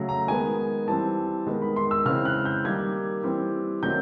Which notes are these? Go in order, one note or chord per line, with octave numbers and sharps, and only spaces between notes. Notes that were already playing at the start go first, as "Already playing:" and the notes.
Already playing: C#3 F#3 A3
A#5
D#3 G#3 B3 G#5
E3 G3 C4 A5
D#3 G#3 B3
B5
C6
E6
C#3 E3 G#3 C4 F6
F#6
G6
D#3 G3 A#3 G#6
E3 G3 C4
D#3 F#3 A3 C4 G6